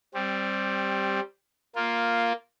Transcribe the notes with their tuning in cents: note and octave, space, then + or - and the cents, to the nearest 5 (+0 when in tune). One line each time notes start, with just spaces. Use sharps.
G3 +0 C4 +15
A#3 +0 F4 +0